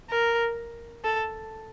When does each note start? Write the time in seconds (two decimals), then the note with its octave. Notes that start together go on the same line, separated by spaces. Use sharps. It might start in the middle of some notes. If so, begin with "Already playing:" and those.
0.10 A#4
1.04 A4